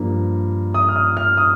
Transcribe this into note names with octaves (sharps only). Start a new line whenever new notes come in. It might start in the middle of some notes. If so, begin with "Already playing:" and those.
Already playing: G2 F3 A#3
D#6
F6
D#6
F6
D#6